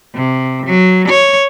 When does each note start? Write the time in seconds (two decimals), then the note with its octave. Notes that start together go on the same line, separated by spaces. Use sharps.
0.14 C3
0.66 F#3
1.09 C#5